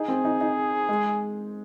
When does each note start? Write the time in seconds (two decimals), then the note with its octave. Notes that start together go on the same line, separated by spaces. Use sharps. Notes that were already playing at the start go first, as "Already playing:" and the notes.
Already playing: D#4 G#4
0.08 C4
0.25 D#4
0.41 D#4
0.89 G#3